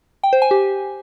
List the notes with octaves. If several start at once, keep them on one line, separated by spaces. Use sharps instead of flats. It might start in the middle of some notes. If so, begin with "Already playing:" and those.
G5
C5
G#5
G4